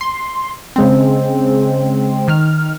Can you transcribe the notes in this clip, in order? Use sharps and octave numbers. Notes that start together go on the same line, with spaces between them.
C6
C#3 G#3 C4
D#3 F6